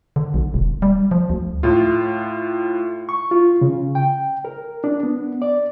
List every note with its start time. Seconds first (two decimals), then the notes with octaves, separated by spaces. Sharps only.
0.16 D3
0.34 B1
0.54 E1
0.82 G3
1.11 F3
1.30 D2
1.63 A2 F4
3.09 C#6
3.31 F4
3.61 C#3
3.95 G5
4.45 A#4
4.84 D4
5.03 B3
5.42 D5